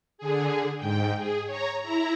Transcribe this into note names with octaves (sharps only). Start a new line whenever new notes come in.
D3 G#4
G#2 G5
G#4
C#5 A#5
E4 A#5